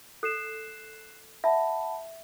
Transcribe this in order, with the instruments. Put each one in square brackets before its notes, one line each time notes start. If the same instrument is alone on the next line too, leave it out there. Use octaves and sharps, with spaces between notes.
[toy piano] A4 [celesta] F#6 C7 E7
[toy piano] E5 [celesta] F#5 A5 B5